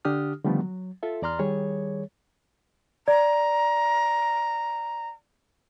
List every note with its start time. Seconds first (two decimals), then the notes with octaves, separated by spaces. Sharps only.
0.05 D3 D4 G4 D#6 F6
0.45 D3 D#3 F3 G3 A3 B3
0.60 F#3
1.03 F4 A4 E5
1.22 E2 D5 A#5 C6 F6
1.39 D#3 G3 G#4 C#5
3.08 D5 A#5